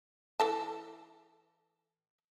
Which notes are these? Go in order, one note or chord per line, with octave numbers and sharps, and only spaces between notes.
E3 A4 A5